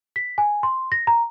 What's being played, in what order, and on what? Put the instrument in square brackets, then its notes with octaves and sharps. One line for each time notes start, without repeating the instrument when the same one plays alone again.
[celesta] B6
G#5
C6
A#6
A#5